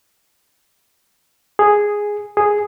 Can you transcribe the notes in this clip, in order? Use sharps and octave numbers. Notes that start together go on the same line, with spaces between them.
G#4
G#4